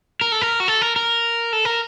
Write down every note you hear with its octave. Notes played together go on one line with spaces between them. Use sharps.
A#4
A4
A#4
F#4
A4
A#4
A#4
A4
A#4